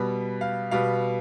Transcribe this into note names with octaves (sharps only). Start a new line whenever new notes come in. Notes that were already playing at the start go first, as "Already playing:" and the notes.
Already playing: B2 G3 B3 B5
F5
B2 G3 B3 F5